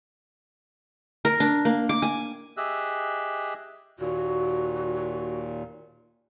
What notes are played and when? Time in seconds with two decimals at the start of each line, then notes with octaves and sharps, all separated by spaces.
1.25 A#4
1.40 D4
1.65 A#3
1.89 D6
2.02 G#5
2.57 G4 G#4 D#5 E5 E6 F#6
3.99 D#2 A#2 F#4